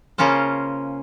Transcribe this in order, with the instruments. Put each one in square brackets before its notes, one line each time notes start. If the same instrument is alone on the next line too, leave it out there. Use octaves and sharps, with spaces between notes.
[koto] C#3 A#3 C#4 F4 C5